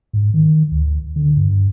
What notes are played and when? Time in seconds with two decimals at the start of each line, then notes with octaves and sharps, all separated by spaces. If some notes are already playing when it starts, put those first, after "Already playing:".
0.13 G#2
0.34 D#3
0.72 D2
1.16 D3
1.37 G2